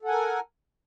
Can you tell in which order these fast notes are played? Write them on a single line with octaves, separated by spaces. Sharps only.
A4 F#5 G#5 A#4